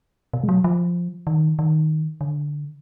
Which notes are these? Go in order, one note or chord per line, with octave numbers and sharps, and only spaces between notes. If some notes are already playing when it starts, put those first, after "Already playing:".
B2
G#3
F#3
F3
D#3
D#3
D3